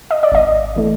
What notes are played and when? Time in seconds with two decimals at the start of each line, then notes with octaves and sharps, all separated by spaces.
0.11 D#5
0.23 D5
0.32 G#1 D#5
0.76 E3 A3